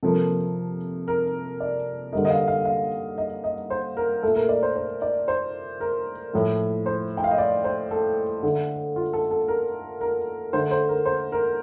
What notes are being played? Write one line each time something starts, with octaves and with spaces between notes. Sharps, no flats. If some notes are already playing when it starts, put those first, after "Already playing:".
C3 F3 A#3 A4
A#4
D5
D3 G3 A#3 D#5
D#5
F5
F5
F5
D#5
D#5
C5
A#4
A#2 A3 A4
A#4
D5
C5
C5
D5
C5
A#4
A2 F3 A3
C5
G5
F5
D#5
D5
C5
A4
D3 A3
F4
A4
A4
A#4
A#4
D3 A3 C5
C5
A#4
C5
A#4